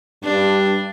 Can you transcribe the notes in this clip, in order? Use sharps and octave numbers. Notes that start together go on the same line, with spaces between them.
G2 D4